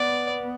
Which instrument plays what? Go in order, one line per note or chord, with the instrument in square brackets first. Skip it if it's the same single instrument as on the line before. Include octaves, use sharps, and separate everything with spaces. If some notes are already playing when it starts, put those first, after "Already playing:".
Already playing: [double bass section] B3 [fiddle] D5